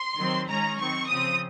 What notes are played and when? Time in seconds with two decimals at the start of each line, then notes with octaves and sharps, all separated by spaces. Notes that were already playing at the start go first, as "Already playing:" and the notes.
Already playing: C6
0.17 D#3 F#3 C4
0.48 D#3 G#3 C#4 A#5
0.78 D#3 F#3 C4 C#6
1.08 C#3 F3 C4 D#6